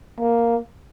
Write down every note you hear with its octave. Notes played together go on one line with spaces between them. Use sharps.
A#3